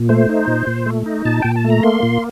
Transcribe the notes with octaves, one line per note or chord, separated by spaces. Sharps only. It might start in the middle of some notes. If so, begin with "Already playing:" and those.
Already playing: A#2
A3 C5
D#4
A#2
A#2
A3
D#4
A#2 A5
A#2 G5
A5
A3
A#5
A#3 C6
A#2